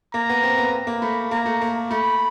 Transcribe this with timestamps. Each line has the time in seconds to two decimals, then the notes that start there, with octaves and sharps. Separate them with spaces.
0.14 A#3 A#5
0.29 B3
0.43 C4
0.58 B3
0.87 A#3
1.02 A3 B5
1.31 A#3 A#5
1.46 A3
1.61 A#3
1.91 A3 B5